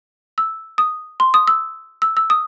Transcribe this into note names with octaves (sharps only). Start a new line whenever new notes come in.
E6
D#6
C6
D#6
E6
E6
E6
D#6